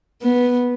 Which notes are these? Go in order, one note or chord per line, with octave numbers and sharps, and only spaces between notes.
B3